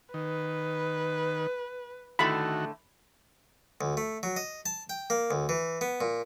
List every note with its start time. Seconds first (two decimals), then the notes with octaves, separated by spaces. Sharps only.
0.14 D#3 B4
2.19 A2 D3 D#3 A3 F#4 B5
3.81 D2
3.97 A3
4.23 F#3
4.36 D#5
4.66 A5
4.90 G5
5.10 A#3
5.31 D2
5.49 E3
5.81 B3
6.01 A#2